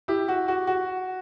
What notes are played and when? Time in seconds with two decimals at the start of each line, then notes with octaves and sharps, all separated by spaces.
0.08 E4 G4
0.28 F#4
0.48 F#4
0.67 F#4